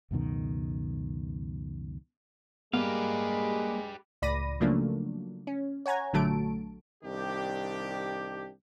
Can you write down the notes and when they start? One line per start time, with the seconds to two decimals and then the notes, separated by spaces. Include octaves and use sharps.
0.11 C#2 F#2 B2 D#3
2.74 G3 G#3 A#3 B3 G4 B4 F5
4.22 C#2 A2 D5 B5 A#6 D#7
4.60 C#3 F3 F#3 A3 A#3 D4
5.47 C#4
5.86 C#5 F#5 G#5 A#5 G#6
6.13 A#1 D3 F#3 A3 A5 D7
7.04 C2 D#3 D4 G4